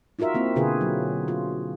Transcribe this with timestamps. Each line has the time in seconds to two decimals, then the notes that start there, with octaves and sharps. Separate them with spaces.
0.19 D#4 F4 F#4 A#4 E5
0.34 A#3 C4 E4
0.56 B2 D3 F4 G#4 B4
0.81 F#3
1.28 F4